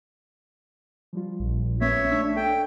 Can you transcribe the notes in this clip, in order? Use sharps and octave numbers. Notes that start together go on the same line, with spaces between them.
F3 G3 F4
A#1
A#3 B3 C#4 C#5 E5
A3 D4 E6
A4 G5